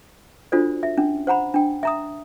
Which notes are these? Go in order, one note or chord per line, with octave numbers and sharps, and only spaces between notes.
D4 F4 F#4 A4 C5 D5
E5
C#4 D4
C5 F#5 A#5 B5
D4 G5
E5 A#5 D#6